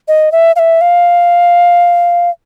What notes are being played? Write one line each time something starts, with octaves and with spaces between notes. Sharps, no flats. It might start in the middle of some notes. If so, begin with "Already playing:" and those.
D#5
E5
F5
E5
F5